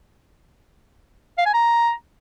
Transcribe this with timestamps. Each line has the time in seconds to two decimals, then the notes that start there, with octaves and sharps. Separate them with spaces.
1.38 F5
1.46 G#5
1.54 A#5